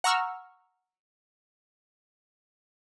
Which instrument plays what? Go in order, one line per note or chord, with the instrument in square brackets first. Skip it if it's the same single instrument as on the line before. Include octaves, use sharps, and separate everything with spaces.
[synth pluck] F#5 A#5 C#6 E6 F6